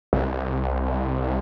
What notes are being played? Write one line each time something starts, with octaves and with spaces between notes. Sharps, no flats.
C2